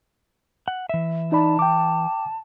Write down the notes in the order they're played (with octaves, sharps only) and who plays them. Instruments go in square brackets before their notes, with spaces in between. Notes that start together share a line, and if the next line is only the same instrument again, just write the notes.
[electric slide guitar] F#5
E3 E5
[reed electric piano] D#4 D5 B5 [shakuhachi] A5
[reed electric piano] G5 D6